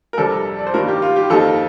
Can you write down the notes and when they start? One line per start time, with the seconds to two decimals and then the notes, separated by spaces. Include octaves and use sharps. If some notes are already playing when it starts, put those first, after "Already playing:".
0.13 A#4
0.17 F2 C3 G3 D4 A4
0.59 D5
0.67 C5
0.74 G2 D#3 G3 A#3 A#4
0.88 G4
1.02 F4
1.16 G4
1.30 F2 D#3 A#3 D#4 A4